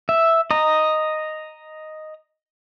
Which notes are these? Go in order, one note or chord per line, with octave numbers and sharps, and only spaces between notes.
E5
D#5 A#5